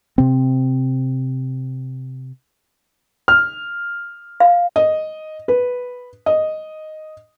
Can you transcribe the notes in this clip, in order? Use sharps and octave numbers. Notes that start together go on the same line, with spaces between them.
C3 C4
F6
F5
D#5
B4
D#5